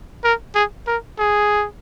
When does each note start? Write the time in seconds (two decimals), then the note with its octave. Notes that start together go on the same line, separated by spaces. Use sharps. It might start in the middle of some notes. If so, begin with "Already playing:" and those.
0.24 A#4
0.55 G#4
0.87 A#4
1.19 G#4